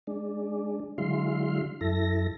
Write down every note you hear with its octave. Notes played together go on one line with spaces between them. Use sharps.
G#3 D4
D3 F#3 G#3 E4 F5 C6
F#2 E4 A4 A#6